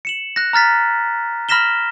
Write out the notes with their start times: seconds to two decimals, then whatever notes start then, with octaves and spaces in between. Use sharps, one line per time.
0.05 C#7 E7 F#7
0.36 F#6 A#6
0.53 A#5 F6 A6 B6
1.49 B5 F6 A#6 B6 E7 G7